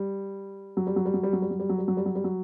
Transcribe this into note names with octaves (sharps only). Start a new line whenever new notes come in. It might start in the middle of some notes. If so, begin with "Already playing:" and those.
Already playing: G3
F#3
G3
F#3
G3
F#3
G3
F#3
G3
F#3
G3
F#3
G3
F#3
G3
F#3
G3
F#3